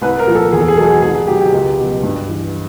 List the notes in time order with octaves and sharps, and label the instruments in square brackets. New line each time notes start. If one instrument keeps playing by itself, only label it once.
[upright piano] C2 B4
A#4
A#2 F3
A4
E2 G#4
A4
G#4
B2 F#3 A4
G#4
C2 G#4
G#4
B2 F#3 G4
G4
C#2 G4
B2 F#3
G2
E3